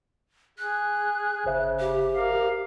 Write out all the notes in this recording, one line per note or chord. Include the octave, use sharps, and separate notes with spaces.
G#4 F#6
G1 C#3 C5 E5
G4
A#4 F5